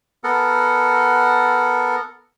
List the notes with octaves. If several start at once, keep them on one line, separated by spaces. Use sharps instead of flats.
B3 A4 A#4 F#5